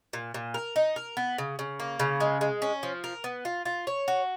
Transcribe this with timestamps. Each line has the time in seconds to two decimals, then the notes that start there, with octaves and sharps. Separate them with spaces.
0.13 A#2
0.34 A#2
0.54 A#4
0.76 D#4
0.96 A#4
1.17 B3
1.38 C#3
1.59 C#3
1.80 A#3
2.00 C#3
2.20 G#3
2.41 G#3
2.62 C#4
2.83 F3
3.04 A#4
3.24 B3
3.45 F4
3.65 F4
3.87 C#5
4.08 F#4